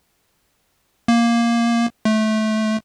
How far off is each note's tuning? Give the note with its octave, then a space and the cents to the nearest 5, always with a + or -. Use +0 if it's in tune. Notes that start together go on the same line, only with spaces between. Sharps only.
A#3 +5
A3 -20